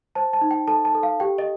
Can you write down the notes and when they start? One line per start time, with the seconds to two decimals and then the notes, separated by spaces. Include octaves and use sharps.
0.15 C5 A5
0.33 A5
0.41 D#4
0.51 G5
0.68 A4 A5
0.85 A5
0.95 A4
1.03 F5
1.20 G4 G5
1.38 D#5